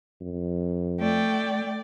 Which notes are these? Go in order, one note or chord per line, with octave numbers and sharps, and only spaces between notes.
F2
A3 D5 G5